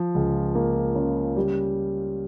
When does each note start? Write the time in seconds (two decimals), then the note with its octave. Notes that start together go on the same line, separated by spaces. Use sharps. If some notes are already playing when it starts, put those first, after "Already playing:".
Already playing: F3
0.15 C#2
0.55 A#3
0.96 C#3
1.36 G3